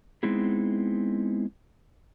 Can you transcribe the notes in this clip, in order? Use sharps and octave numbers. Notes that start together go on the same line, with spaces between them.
G#3 B3 C4 D#4 E4 G#4